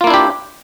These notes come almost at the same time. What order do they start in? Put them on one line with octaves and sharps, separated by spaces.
F4 A#3 E4 D4 G4